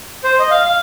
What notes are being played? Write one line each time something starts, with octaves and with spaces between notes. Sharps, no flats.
C5
D#5
F5
F5